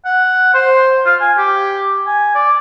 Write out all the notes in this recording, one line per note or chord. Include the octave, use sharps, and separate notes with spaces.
F#5
C5
F4
G#5
G4
G#5
D5